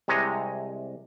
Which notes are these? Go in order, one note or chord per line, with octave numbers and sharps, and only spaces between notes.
C2 C3 G#3 C#5 D#5